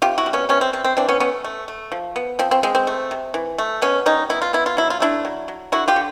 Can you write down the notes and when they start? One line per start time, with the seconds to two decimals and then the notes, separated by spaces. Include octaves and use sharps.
0.02 C3 F4 G4
0.18 E4 F#4
0.26 G3
0.33 B3 C#4
0.49 C3 B3 C#4
0.61 C4
0.73 C3 C4
0.84 C4
0.97 E3 C4 D4
1.09 B3 C#4
1.20 A3 B3 C#4
1.44 A3
1.68 A3
1.92 F3
2.16 B3
2.39 F3 C4
2.51 C4
2.63 G#3 C4
2.75 C4
2.87 A3
3.11 C3
3.34 E3
3.58 A3
3.82 B2 B3 C#4
4.06 G3 C#4 D#4
4.30 B3 E4
4.42 F4
4.53 B3 E4
4.66 F4
4.77 F#3 E4
4.90 F4
5.00 A3 D4 E4
5.25 F#3
5.48 F#3
5.72 D3 E4 F#4
5.88 F4 G4
5.96 D3